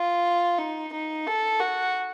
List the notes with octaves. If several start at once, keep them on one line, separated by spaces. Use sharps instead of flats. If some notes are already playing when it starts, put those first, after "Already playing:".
Already playing: F4
D#4
D#4
A4
F#4